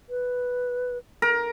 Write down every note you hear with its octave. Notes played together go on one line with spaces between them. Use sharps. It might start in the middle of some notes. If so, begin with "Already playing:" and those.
B4
A#4